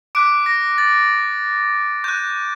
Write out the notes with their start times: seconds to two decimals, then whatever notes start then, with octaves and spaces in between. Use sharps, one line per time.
0.15 D6 F#6 D7
0.46 A#6
0.78 A6
2.04 C#6 F#6 G6